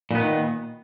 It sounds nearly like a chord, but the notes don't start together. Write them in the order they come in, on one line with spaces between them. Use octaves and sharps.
A#2 B3 D#3